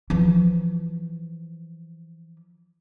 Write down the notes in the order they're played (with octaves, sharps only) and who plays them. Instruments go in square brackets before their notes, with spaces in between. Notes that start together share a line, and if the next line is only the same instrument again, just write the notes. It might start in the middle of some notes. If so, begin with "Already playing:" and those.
[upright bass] E3 F3